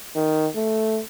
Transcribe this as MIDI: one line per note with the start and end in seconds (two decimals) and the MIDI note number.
0.15 0.47 51
0.56 1.00 57